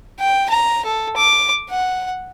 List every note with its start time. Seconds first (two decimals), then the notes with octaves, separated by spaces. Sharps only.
0.20 G5
0.49 A#5
0.85 A4
1.17 D6
1.70 F#5